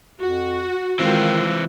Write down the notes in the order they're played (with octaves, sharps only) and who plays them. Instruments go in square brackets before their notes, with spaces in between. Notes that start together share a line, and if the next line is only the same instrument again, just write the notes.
[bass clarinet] F2 [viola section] F#4
[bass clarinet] D#3 [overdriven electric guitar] E3 C4 [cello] G#3 F4